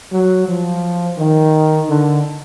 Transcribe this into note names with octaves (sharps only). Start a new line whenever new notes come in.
F#3
F3
D#3
D3